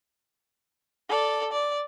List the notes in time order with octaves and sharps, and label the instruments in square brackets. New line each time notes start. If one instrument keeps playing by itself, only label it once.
[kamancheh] A4 D5
D5